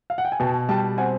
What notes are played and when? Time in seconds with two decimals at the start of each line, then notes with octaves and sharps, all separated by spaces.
0.10 F5
0.18 F#5
0.25 G5
0.32 G#5
0.40 B2 G5 A5
0.69 G3 G5 A5
0.97 C4 F#5 G#5